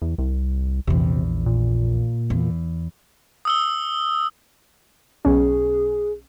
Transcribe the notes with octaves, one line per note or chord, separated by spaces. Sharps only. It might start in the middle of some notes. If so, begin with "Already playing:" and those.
E2
C2
A#1 E2 C3
A#2
E2
D#6 E6 G7
B1 C#4 G#4